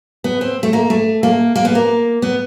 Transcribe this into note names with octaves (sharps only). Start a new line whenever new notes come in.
B3
C4
A3
A#3
A3
A#3
A#3
B3
A#3
B3